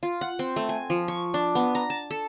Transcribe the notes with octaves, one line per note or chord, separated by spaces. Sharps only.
F4
F#5
C4
A3
G#5
F3
C#6
D4
B3
A#5
A5
A4